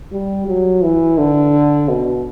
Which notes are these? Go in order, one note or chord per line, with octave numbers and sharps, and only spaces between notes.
G3
F#3
E3
D3
B2